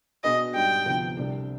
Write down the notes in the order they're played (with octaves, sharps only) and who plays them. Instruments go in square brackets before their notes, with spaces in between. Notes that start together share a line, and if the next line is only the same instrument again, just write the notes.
[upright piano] B2 B3 D4 G#4 [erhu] D#5
[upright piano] G#2 G3 D4 [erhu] G5
[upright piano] D2 C3 F3 B3
C2 C3 G3 D4